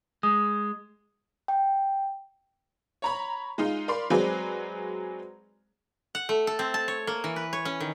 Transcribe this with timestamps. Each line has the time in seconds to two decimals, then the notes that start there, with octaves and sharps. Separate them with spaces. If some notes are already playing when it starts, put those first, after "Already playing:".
0.23 G#3 D#6
1.48 G5
3.02 C#5 A#5 B5
3.58 G#3 D#4 F4
3.88 A#4 D5 F5 B5 C6
4.10 F#3 G#3 C4 G#4 B4 D5
6.15 F#5
6.29 A3
6.47 A4
6.59 C4
6.74 A5
6.88 C#5
7.07 A#3
7.24 E3
7.36 B4
7.53 C#5
7.65 C#4
7.80 D#3